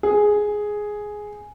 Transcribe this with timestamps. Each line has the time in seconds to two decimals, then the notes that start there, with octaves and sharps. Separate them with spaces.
0.03 G#4